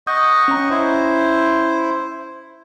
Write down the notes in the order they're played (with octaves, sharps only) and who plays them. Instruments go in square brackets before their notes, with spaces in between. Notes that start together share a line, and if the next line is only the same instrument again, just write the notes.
[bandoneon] D#5 F#5 C#6 [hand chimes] D#6 G6
[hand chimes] C#4 A#5
[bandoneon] E4 C5